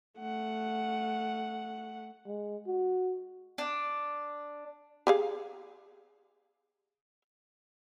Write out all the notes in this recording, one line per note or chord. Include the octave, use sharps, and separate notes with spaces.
A3 F#5
G#3
F#4
D4
G4 G#4 F5